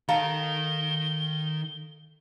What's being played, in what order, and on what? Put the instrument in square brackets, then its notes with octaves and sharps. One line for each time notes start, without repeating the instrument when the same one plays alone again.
[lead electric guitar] D#3 D#4 [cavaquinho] A4 F5 A#5 [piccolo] G7